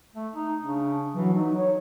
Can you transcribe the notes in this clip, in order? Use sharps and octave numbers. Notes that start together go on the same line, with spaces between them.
A3
D#4
C#3 D4
E3 F#3
F#3 D#4
C#5